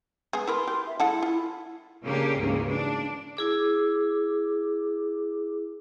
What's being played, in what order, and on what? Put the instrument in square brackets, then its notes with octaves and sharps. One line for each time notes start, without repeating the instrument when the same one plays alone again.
[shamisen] G#3 B3 G#4
[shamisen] E4 A#4 B4 [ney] C6
[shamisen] G4
[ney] E5
[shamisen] G#3 A4 F#5 [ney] E4
[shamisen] F4
[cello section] C#3 A#3 C#4 D4 G4
D2 G#2 C#3 E3 A#3
D4
[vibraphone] E4 G#4 D6